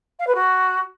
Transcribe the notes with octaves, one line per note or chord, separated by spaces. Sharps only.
F5
B4
F#4